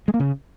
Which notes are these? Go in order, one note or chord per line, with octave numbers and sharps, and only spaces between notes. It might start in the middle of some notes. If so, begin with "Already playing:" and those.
G#3
A#3
C#3